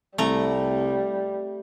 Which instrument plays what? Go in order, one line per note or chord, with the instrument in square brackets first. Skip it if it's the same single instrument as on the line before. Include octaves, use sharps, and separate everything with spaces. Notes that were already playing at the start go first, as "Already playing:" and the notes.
[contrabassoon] C2 [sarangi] G3 [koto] A3 A#5